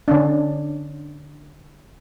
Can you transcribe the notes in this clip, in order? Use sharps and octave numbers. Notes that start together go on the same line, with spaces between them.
D3 C#4 D4